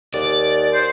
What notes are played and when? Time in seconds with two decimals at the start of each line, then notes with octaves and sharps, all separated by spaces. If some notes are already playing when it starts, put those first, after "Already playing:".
0.14 D#2 D5
0.73 C5